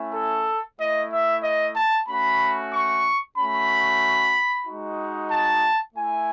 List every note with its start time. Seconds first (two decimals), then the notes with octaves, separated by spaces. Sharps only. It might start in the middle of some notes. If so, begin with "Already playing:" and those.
Already playing: A3 C#4 E4
0.14 A4
0.78 A3 E4 D#5
1.10 E5
1.43 D#5
1.75 A5
2.07 A3 C#4 F#4 B5
2.72 C#6
3.36 A3 C#4 F#4 B5
4.65 G#3 D#4 F#4
5.30 A5
5.94 A3 E4 G#5